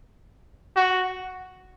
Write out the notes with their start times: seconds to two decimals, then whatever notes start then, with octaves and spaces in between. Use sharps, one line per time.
0.76 F#4